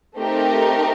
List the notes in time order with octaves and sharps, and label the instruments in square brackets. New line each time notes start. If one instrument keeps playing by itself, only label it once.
[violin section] A3 C4 D#4 G4 A#4